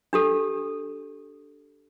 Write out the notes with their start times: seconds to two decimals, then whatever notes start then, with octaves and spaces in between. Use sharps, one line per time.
0.13 D4 G4 A4